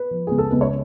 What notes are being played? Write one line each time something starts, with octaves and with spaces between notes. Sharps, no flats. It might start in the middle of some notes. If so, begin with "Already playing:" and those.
Already playing: B4
F3
C#2 G#4
A4
C#2 B4
C#5